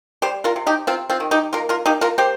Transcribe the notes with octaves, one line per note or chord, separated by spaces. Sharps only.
G3 G4 C5
F4 A#4
C3
D#4 G4
C3 C4 F4
C4 F4
D#3
D#4 G4
A#3 F4 A#4
F4 A#4
A#3 D#4 G4
F4 A#4
A#3 G4 C5